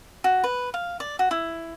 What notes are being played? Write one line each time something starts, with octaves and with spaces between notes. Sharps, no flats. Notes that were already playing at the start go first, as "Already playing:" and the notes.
F#4
B4
F5
D5
F#4
E4